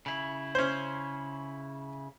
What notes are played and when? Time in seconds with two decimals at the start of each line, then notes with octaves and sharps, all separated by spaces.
0.06 C#3 E4
0.55 C#4 C5